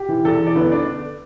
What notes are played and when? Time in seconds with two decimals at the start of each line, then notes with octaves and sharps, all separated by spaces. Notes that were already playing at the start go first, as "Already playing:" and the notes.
Already playing: G4
0.09 E3
0.25 E2 A4
0.40 E3
0.47 D5
0.56 D2 B3 B4
0.72 D3 D4 D5